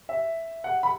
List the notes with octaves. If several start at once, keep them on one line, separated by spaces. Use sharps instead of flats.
E5
F#5
B5